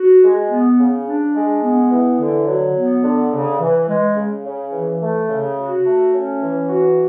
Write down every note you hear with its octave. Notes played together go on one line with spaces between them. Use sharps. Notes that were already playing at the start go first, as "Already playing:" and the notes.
Already playing: F#4
G#3
B3
C#3
D4
G#3
B3
E3
D3
F#3
B3
D3
C#3
E3
G#3
C#3
C#3
E3
A3
C#3
F#4
A3
C#4
E3
F#4